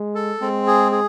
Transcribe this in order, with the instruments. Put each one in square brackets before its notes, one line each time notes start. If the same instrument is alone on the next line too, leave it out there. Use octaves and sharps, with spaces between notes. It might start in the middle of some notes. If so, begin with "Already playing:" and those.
Already playing: [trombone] G#3
[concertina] A4
[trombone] G#3 [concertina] C4
[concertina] G#4
G#4